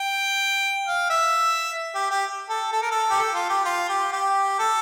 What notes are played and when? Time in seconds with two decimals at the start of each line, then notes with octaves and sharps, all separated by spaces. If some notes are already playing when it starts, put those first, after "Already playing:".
Already playing: G5
0.86 F5
1.09 E5
1.95 G4
2.11 G4
2.49 A4
2.72 A4
2.82 A#4
2.91 A4
3.10 G4
3.19 A4
3.34 F4
3.50 G4
3.65 F4
3.89 G4
4.13 G4
4.59 A4